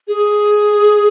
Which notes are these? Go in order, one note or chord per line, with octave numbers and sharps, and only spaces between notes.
G#4